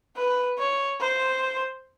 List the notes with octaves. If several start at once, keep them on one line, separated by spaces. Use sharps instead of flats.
B4
C#5
C5